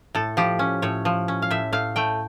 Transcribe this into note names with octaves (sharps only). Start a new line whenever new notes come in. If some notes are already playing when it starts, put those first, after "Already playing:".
A2 A4
F3 G4
C#4
A2 C#5
F3
C#4
F5
A2 E5
A2 F5
A3 G5